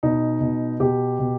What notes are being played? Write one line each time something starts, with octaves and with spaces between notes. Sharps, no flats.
B2 D#4
B2
B2 G4
B2